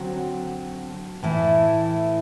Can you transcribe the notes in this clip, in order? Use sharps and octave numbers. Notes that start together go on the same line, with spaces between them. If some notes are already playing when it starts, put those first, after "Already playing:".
Already playing: D3 F#3 C4 F#4
A2 E3 A3 E4